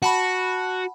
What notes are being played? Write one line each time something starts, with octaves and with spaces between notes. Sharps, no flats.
F#4 F#5 A5 B5